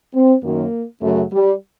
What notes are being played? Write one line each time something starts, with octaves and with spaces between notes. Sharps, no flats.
C4
F#2 D#3 F#3 A#3
F#2 C#3 F#3 A3
G3